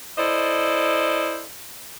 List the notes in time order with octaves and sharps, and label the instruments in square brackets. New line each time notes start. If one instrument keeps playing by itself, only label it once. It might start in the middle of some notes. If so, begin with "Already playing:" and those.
[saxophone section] E4 A4 C5 D5 D#5